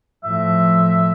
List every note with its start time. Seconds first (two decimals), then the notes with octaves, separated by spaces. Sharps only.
0.24 A2 F3 E5